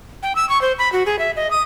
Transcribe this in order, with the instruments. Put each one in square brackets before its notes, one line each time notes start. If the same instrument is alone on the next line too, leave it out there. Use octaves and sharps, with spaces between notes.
[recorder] G5
E6
C#6
C5
B5
F#4
G#4
E5
D#5
D#6